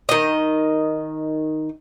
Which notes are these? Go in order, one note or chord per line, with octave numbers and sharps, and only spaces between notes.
D#3 D#5